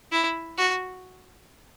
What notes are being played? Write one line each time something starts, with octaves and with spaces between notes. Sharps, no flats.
E4
F#4